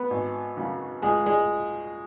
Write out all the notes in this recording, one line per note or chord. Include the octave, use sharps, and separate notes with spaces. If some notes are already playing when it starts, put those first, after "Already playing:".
Already playing: B3 B4
G#1
F#2 C#3 F#3
C#2 G#3 G#4
G#3 G#4